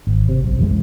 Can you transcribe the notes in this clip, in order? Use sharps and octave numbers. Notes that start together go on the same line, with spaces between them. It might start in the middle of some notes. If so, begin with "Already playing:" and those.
G#1
C3
B1
F#2 E3 F3 G#3